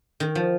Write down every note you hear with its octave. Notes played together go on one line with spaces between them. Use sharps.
D#3
F3